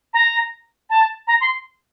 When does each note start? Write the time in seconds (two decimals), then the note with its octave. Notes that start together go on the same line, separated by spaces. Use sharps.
0.14 A#5
0.90 A5
1.28 A#5
1.41 C6